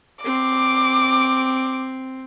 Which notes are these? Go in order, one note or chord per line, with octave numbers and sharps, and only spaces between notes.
C4 D6